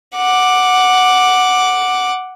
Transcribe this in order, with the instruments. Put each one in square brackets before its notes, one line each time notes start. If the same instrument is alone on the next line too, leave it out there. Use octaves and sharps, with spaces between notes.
[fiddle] F#5 D6